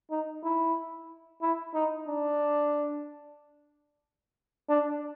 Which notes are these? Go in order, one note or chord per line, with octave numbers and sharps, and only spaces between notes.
D#4
E4
E4
D#4
D4
D4